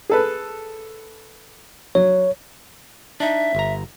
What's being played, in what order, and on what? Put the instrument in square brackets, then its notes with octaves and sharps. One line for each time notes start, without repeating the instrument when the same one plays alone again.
[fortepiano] G#4 A4 B4
[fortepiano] F#3 [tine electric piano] C#5
[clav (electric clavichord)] D4 D#4 [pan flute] E5
[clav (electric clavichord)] G1 A#5